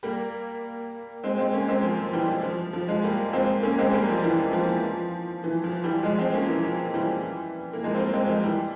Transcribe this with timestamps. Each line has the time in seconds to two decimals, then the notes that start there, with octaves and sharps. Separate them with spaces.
0.03 G3 A#3
1.24 G#3 C4
1.38 G#3 C4
1.53 A#3 C#4
1.68 G#3 C4
1.83 F3
1.99 F3
2.13 E3 G3
2.29 F3
2.43 F3
2.73 F3
2.88 F3 G#3
3.04 G3 A#3
3.33 G#3 C4
3.63 A#3 C#4
3.78 G#3 C4
3.93 G3 A#3
4.09 F3
4.23 E3 G3
4.53 F3
5.44 E3
5.64 F3
5.84 E3 G3
6.03 F3 G#3
6.19 G#3 C4
6.33 A#3 C#4
6.49 E3
6.63 F3
6.94 E3 G3
7.73 A#3
7.84 F3 G#3
7.95 C4
7.98 G3 A#3
8.13 G#3 C4
8.29 F3 G#3
8.44 E3 G3